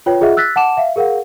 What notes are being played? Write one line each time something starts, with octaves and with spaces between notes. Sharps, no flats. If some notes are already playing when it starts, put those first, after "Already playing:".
F4 B4 C#5 G5
F4 G#4 D#5 E5 F#5
E6 F#6 A6 B6
F#5 A5 D6 E7
E5 F5
G#4 A#4 F5 F#5